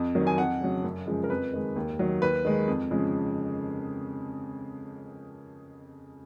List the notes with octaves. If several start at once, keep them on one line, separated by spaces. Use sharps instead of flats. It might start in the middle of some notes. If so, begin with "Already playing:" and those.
Already playing: F2
D#3 F#3
G#5
F2 F#5
C#3 F#3
F#2
C#3 F3 G#3
A#4
F2 B4
D#3 G#3
D#2
D#3 F#3
D#2 B4
D#3 G#3
F2
C#3 F3 G#3